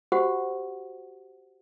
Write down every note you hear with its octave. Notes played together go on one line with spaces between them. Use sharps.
F#4 G4 C5 F#5